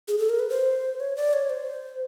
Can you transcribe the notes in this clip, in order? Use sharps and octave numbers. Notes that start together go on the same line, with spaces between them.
G#4
A4
A#4
B4
C5
C#5
D5
C#5
C5